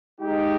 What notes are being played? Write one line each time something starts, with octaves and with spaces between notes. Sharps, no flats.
G#3 D#4 G4